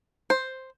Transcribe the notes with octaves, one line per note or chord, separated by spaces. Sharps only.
C5